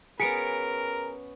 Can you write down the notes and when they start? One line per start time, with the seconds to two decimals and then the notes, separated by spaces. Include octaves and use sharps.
0.20 B3 C#4 F#4 G#4 A#4 B6 C#7 D7